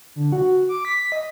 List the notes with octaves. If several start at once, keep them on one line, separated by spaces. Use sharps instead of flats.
D3
F#4
D6
B6
D#5